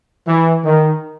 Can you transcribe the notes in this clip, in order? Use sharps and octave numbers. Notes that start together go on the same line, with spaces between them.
E3
D#3